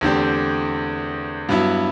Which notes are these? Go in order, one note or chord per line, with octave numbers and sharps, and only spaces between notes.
E2 D3 A3 C4 G4
G2 F#3 B3 E4